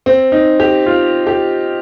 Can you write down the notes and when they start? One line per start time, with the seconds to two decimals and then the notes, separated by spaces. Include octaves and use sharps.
0.06 C4
0.32 D#4
0.60 G4
0.86 F4
1.27 G4